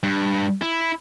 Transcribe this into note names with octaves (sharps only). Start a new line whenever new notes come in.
G2
E4